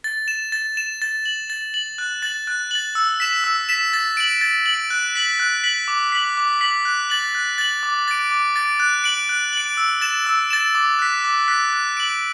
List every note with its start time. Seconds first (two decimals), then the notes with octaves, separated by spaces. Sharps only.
0.04 A6
0.28 E7
0.52 A6
0.77 E7
1.02 A6
1.26 F#7
1.50 A6
1.74 F#7
1.98 F#6
2.22 A6 F#7
2.47 F#6
2.71 A6 F#7
2.95 E6
3.20 B6 E7
3.44 E6
3.69 B6 E7
3.93 A6
4.17 D7 F#7
4.41 A6
4.66 D7 F#7
4.90 F#6
5.15 B6 F#7
5.40 F#6
5.64 B6 F#7
5.88 D6
6.12 B6 F#7
6.37 D6
6.61 B6 F#7
6.85 F#6
7.10 A6 F#7
7.35 F#6
7.58 A6 F#7
7.83 D6
8.08 A6 D7
8.31 D6
8.56 A6 D7
8.80 F#6
9.04 D7 F#7
9.29 F#6
9.53 D7 F#7
9.77 E6
10.01 A6 E7
10.27 E6
10.50 A6 E7
10.75 D6
10.99 F#6 B6
11.24 D6
11.48 F#6 B6
11.73 F#6
11.97 D7 F#7